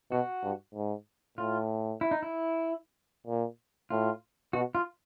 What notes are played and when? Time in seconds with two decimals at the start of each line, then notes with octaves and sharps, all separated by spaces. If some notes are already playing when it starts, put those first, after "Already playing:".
0.11 B2 F#4
0.43 G2
0.75 G#2
1.38 A2 F4
2.01 E4
2.11 D#4
2.22 E4
3.27 A#2
3.90 A2 F4
4.53 B2 F#4
4.75 F4